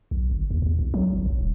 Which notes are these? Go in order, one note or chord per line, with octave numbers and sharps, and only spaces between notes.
B1
G1
D#2
E2
C2
F#3
G#1
B1
D#1